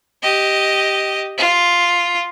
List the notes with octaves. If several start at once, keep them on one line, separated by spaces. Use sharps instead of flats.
G4 D#5
F4